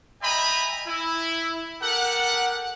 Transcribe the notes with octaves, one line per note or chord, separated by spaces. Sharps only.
D#5 E5 G5 G#5 A#5 B5
E4
G4 A4 A#4 F#5